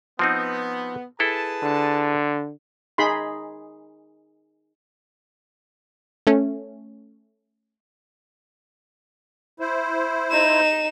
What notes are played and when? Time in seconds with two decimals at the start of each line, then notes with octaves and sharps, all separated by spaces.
0.19 F3 B3 C4 D#4
1.20 E4 G#4 A4 B4 A5
1.63 D3
2.98 D#4 G#4 B5 C6
6.27 A3 C#4
9.60 E4 C5
10.31 D#4 E7